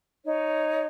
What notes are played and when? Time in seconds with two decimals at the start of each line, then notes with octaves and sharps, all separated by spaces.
0.24 D#4 C#5